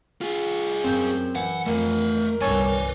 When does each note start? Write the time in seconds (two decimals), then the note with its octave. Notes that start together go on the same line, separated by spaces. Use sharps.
0.21 F4 G#4
0.84 F#2 C4 G5
1.36 E3 F#5
1.66 F2 A3 A#4 F5
2.41 G1 C2 A4 B4 C#5 D5 G#5